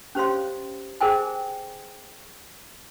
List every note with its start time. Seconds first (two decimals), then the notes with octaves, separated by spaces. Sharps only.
0.15 C#4 G4 C5 C#5 F5 C6
1.01 G#4 A#4 C5 D#5 G5 G#5